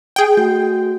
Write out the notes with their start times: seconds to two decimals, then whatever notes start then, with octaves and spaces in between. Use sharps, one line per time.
0.16 G#4 G5
0.37 A3 F#4 G6